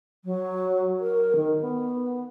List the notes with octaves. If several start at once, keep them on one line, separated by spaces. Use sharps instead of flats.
F#3
A#4
D#3
B3